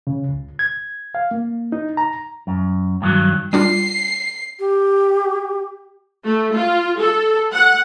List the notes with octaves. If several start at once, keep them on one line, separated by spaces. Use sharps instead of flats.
C#3
C#2
G#6
F5
A#3
D#4
A#5
F#2
G2 D3 D#3 F#3
G3 D4 F4 C7
G4
A3
F4
A4
F#5